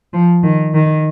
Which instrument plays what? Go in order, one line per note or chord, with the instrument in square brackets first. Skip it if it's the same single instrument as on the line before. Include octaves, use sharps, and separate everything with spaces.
[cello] F3
D#3
D#3